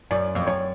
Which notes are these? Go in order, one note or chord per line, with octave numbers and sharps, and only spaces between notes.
F#2 D5
F2
F#2 C#5